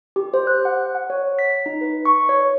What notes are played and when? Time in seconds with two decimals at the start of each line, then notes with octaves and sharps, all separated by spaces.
0.16 G4
0.34 C5
0.47 F#6
0.65 F#5
0.95 F#5
1.10 C#5
1.39 B6
1.66 D#4
1.81 B4
2.05 C#6
2.29 C#5